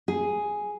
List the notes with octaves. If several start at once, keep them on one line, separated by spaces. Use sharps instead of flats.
G#4